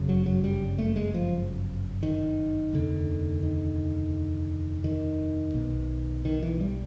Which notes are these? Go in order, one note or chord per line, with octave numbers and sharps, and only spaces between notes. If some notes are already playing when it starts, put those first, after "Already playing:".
Already playing: G1 F#2 C#3
F#3
F#3
G3
A3
G#3
F3
D#3
F1 D#2 D3
D#3
D#3
B1 B2
D#3
E3
G3